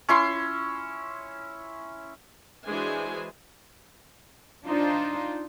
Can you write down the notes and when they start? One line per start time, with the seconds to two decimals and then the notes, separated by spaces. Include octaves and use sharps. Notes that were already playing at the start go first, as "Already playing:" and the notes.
0.09 C#4 E4 C6
2.67 E3 G#3 D4 F#4 C5 G#5
4.66 D4 D#4 F4 C5